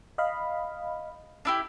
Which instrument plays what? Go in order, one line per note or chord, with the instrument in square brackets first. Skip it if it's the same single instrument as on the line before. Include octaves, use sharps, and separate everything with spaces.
[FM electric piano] D#5 F5 B5
[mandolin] D4 E4 G4